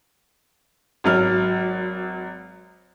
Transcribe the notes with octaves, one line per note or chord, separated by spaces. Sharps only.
G#1 F#3 F6